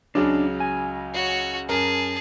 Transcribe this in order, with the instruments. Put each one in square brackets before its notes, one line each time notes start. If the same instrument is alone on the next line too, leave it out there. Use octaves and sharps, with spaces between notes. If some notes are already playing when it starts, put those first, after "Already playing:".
[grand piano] C#2 C#3 F#3 [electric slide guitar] D4
[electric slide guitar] G#5
[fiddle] F#4 C#5
[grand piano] F#2 A#4 [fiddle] G#4 A5